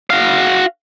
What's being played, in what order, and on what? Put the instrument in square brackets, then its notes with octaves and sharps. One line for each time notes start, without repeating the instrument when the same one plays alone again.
[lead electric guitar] F#4 F5